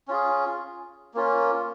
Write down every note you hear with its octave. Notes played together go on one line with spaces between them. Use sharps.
C#4 F4 G#4
A#3 C#4 F4